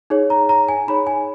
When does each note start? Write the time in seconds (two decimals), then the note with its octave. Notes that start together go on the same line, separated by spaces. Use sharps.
0.10 D#4 G#4 C#5
0.30 A#5
0.49 A#5
0.69 G#5
0.88 D#4 G#4 C#5 B5
1.07 G#5